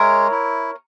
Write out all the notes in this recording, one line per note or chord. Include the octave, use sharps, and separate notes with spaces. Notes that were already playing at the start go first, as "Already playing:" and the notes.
Already playing: G#3 A#4 C#5 E5
E4